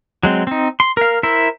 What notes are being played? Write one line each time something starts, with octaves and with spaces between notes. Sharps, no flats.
F#3 G#3 C4
C4 D#4
C6
A#4 F5
E4 A#4 C5 E5